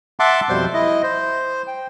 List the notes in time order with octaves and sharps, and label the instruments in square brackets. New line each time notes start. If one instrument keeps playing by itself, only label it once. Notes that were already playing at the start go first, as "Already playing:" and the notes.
[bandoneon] E5 F#5 A5 C6 D6
F2 B2 G3 C5 C6
E4 D#5
C5
G5